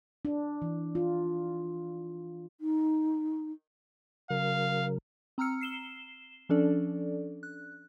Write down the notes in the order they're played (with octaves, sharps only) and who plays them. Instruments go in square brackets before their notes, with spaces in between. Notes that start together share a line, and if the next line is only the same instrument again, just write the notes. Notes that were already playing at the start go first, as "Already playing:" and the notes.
[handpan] D4
E3
F4
[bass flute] D#4
[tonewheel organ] C#3 F#3 A#4 [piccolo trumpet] F5
[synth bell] C4 A#5 E6 F6 C#7
C7 E7 G7
F3 C#4 D4 A4 D5
F#6